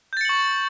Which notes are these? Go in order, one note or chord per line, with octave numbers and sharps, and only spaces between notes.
C#6 G6 A6 C#7 F#7